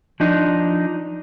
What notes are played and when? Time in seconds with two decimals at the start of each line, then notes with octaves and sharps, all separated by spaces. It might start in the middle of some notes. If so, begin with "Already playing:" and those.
0.20 F3 D4 D#4